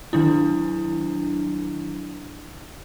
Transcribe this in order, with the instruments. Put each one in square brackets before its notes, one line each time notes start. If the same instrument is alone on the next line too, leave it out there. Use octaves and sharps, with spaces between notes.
[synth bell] D#3 F#3 D4 E4